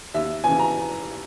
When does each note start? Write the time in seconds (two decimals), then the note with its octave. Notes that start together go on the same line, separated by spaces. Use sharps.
0.14 D#2 E5
0.44 C#3 E3 G#5
0.59 A#5